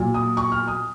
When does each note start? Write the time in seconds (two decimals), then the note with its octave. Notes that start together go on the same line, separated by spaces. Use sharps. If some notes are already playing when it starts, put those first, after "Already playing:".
Already playing: A#2 F#3
0.14 D#6
0.37 C#6
0.52 F6
0.68 D#6